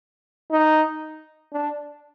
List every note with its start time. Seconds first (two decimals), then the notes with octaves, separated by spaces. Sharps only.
0.51 D#4
1.53 D4